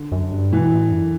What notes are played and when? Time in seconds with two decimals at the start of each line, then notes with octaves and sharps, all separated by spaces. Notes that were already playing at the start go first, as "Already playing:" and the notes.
Already playing: D3
0.12 F#2
0.32 G2
0.52 B2 E3
0.72 A2
0.92 F#2